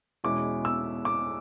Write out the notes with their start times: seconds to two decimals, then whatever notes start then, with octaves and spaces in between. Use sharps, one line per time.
0.24 E2 B2 G#3 C#4 E4 D6
0.65 E6
1.05 D6